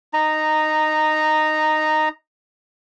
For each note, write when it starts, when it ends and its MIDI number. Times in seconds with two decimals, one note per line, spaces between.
0.13 2.09 63
0.13 2.09 82